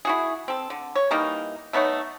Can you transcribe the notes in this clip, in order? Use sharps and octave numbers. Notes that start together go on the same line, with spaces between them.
E4 F#4 G#4
C4 A4
D3
C#5
E3 G3 A#3 D#4
A3 B3 D#4 C#5